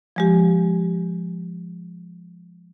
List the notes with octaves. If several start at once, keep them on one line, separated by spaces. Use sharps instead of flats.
F3 G#3 G4